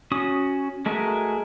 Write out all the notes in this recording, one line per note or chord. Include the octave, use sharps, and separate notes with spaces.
C#4 F#4 D#6
G#3 A3 F#4 G#4 A#4